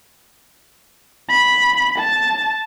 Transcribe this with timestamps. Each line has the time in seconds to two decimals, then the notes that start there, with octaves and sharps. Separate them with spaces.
1.29 B5
1.98 A5